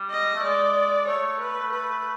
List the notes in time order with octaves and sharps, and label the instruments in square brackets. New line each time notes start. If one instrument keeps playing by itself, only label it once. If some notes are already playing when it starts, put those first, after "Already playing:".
Already playing: [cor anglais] G3
[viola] D#5
[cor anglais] A3
[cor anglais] G#3 [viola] D5
[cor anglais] A3 [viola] C#5
[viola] B4
B4